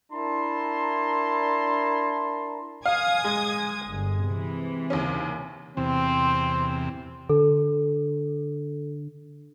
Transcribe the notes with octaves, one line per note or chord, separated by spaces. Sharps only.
D4 E4 A#4 A5 A#5 C6
F5 G#5 D#6 G#6
G#3
G1
C3 E3
D#2 C#3 C#4
E2 C3 C4
D3 A4